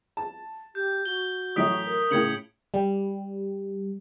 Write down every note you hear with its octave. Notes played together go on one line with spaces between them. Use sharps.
A5
G4 G6
F#4 G7
A1 F#3 E5 D#6 B6 D7
A#4
A2 C#3 G#6 C#7 F#7
G3